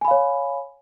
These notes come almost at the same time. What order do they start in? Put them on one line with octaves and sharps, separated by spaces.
G#5 B5 F5 C#5